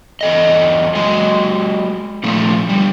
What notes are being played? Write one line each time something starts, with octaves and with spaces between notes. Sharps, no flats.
E2 A4 D#5
F#3 G#3 D#5
A#2 F3 A3 F4
D3 G3